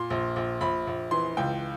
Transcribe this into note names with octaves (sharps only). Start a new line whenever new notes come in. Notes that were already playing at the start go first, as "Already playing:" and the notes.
Already playing: A#2 C6
A#1
A#1
A#1 B5
A#1
E3 C6
C#2 G5